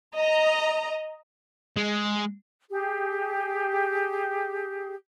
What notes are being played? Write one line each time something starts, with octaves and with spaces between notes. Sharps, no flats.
D#5 A#5
G#3
G4 G#4